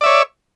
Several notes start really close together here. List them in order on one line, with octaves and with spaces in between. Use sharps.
D5 E5 C#5